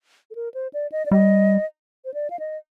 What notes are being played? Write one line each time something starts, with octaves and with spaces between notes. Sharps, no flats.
A4
A#4
C5
D5
D#5
D5
G3 D#5
C5
D5
F5
D#5